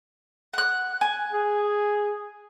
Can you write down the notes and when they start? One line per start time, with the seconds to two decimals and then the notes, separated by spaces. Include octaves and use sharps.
0.54 F#5 F#6
1.01 G#5
1.33 G#4